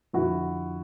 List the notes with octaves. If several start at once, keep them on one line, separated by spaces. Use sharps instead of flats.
F2 D3 E4 F#4